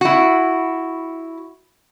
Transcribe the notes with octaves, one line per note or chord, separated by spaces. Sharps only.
E4 F#4